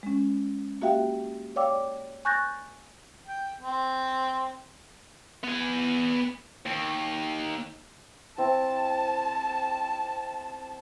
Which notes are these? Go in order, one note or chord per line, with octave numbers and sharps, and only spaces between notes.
G#3 C#4
A#3 F#4 G4 E5 F5 G5
C#5 D5 F5 G5 D6 E6
G#5 C#6 F#6 G6 A6 A#6
G5
C4
B3 G#5
D#2
C4 E4 A5